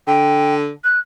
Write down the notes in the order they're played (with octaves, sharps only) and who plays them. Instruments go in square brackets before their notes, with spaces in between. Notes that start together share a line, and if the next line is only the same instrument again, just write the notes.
[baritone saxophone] D3 [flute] G5
[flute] F#6